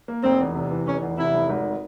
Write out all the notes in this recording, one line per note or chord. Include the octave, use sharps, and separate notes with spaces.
A#3
F1 C4
E2
C3
E3
F1 C#4
E2
C3 E4
F1
G#1